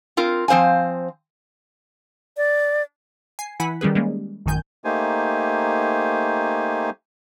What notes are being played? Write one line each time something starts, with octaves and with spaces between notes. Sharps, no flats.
C4 F4 A#4
F3 C4 C5 F5 G#5
D5
G#5 C7
E3 E4 F#5 G#5 B5 B6
D#3 G3 C#4 G#4 B4
G3 G#3 A#3 C#4
A1 F#2 D#3 G#5 G6
A3 A#3 D#4 G4 C5 G#5